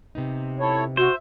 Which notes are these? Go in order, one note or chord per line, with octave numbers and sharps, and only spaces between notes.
C3 B3 D#4
E4 A4 C#5
F#4 C5 E5